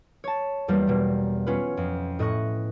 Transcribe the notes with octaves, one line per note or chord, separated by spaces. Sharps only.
C#5 A5
E2 G3 A#3 B4
B2 A#3
B3 C#4 F4 B4
F2
A2 D#5 C#6 F#6